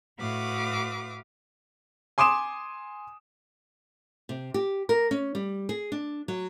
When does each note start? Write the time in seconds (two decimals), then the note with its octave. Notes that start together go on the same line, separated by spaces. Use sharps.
0.17 A2 F#4 B4 F5 D6 D#6
2.18 G#5 C6 D6 D#6 E7
4.29 C3
4.54 G4
4.89 A#4
5.11 C#4
5.35 G3
5.69 G#4
5.92 D4
6.28 F#3